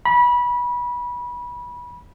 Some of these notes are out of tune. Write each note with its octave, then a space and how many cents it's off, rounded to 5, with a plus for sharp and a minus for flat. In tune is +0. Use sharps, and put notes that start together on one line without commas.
B5 -25